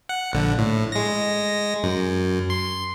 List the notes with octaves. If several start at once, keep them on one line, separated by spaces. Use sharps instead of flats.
F#5
A#1 D3
A2
G#3 A#6
F#2
C6